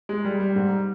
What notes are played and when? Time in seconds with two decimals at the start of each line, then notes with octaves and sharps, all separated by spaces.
0.09 G#3
0.25 G3
0.40 G3
0.56 G#2